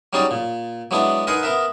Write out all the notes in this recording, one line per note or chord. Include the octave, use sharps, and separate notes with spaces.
F#3 G3 C#4 D#4 G#4 D5
A#2
F#3 G#3 B3 D4 E4
D#4 A#4 B4 F#5 G#5 C6
B3 A#4 E5